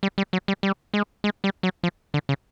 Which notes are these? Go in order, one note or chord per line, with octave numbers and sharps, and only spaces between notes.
G3
G3
F#3
G3
G3
G#3
G#3
G3
F#3
F3
D3
C#3